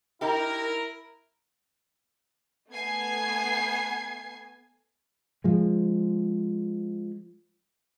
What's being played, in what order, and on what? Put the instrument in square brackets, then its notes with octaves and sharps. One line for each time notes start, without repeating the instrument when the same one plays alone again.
[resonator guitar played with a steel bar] D#4 G4 [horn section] E4 A#4
[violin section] A3 B3 G#5 G#6 C7
[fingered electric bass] F3 G#3